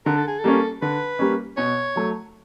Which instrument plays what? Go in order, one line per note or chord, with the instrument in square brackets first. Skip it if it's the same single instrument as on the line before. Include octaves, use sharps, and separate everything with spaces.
[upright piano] D3 [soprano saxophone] A#4
[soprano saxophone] A4
G#4
A4
[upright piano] G3 A#3 C#4
[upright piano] D3 [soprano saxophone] B4
[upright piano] G3 A#3 C#4
[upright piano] B2 [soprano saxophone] C#5
[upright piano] F#3 A3